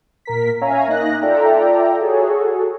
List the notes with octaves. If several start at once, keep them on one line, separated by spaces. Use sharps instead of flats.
A#2 A#4 B6
C#4 C#5 E5 F5 G#5 A#5
A#3 D#4 D#5 F#6 A#6
F4 A4 D5 E5 G5 A#5
F#4 G#4 A4 C#5